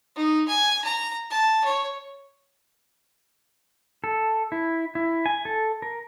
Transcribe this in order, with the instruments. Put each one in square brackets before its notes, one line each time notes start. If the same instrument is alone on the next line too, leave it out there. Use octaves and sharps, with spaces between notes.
[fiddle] D#4
G#5
A#5
A5
C#5
[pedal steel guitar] A4
E4
E4
G#5
A4
A#4